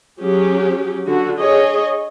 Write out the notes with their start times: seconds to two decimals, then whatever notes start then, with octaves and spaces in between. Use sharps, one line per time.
0.20 F#3 C#4 G4 G#4
1.07 D3 F#4
1.38 G#4 C#5 D#5